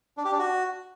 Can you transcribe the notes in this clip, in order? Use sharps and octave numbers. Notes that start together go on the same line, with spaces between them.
D4
G4
D4
F#4